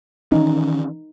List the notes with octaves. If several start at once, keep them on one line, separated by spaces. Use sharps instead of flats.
D#3 E3 C#4 D#4